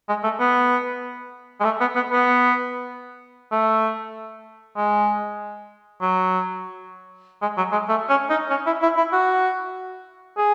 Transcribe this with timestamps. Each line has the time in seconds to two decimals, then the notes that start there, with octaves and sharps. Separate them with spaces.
0.09 G#3
0.24 A3
0.40 B3
1.60 G#3
1.64 A3
1.81 B3
1.96 B3
2.12 B3
3.52 A3
4.77 G#3
6.01 F#3
7.42 G#3
7.57 F#3
7.72 G#3
7.89 A3
8.09 C#4
8.30 D#4
8.50 C#4
8.66 E4
8.82 E4
8.97 E4
9.13 F#4
10.37 G#4